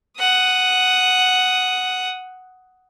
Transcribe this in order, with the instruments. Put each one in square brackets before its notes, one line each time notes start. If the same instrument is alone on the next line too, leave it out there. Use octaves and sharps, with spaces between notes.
[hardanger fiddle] F#5 D#6